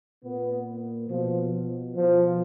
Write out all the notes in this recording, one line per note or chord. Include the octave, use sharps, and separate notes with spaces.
A#2 B3
B2 F3
B2 F3